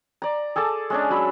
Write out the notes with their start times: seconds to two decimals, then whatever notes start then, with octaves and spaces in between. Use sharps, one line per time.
0.22 D5 A#5
0.56 G#4 A4 A5 D6
0.90 G#3 C#4 D4
1.10 F#3 B5 E6